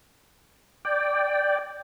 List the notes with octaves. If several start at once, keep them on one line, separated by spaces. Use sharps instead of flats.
D5 G5